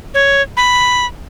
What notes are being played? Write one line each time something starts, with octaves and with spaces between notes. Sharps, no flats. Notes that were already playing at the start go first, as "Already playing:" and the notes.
C#5
B5